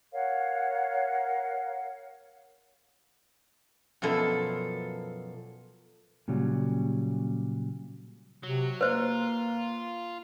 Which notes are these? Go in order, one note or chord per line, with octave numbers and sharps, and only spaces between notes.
A#4 C#5 F5 F#5
F#2 B2 F3 A4
A#2 C#3 F#3 G3
C3 F#3
A#3 F4 B4 C5